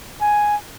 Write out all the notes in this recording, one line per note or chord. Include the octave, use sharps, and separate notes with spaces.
G#5